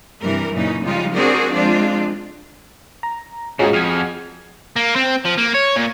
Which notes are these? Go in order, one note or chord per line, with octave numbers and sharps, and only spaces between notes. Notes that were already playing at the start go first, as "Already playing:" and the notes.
G2 C3 E3 G3 A#4
F#2 A#2 C#3 E3 C#4 D#4
C#3 F3 G3 G#3 D#4 F4
C4 D4 F#4 G#4 A#4 D5
F3 G#3 C4 D4 F4
A#5
G#2 G#3 C#4 F4 F#4 G#4
F2 F6 G#6
A#3
C4
F3
A#3
C#5
A#2